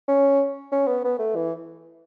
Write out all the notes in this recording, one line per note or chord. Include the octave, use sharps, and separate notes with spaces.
C#4
C#4
B3
B3
A3
E3